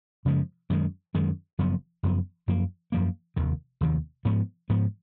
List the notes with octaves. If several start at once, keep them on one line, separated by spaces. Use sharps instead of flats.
F#2 C#3 F3 G#3
F#2 D#3 G#3
F#2 D#3 G#3
F#1 F#2 F3 B3
F#1 F#2 F3 B3
F#2 F3 A#3
F#2 F3 A#3
F1 D#2 D#3
F1 D#2 D#3
G#2 F3 B3
G#2 F3 B3